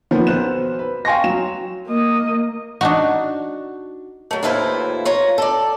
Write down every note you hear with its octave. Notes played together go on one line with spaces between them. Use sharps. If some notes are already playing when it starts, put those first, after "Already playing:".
D#3 F3 A#3 B3 B4 C5
B1 B3 C5 F#6 E7
B4
F5 G5 G#5 C6 C#6 A#6
F#3 E7
A#3 D#5
D4 D#4 F#4
F#3 A3
D#2 A2 E4 F4 B4 C5
F4 C#5 A#5
A4 D5